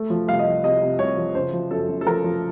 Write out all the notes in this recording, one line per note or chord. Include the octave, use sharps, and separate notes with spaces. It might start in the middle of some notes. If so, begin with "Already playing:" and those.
Already playing: A3
F3
C2 F5
D#5
F3
F5
C3 D#5
C3
C2 C#5
F3
C#3 C5
F3
F#2 A4
F#2
A4
F3 A#4
F3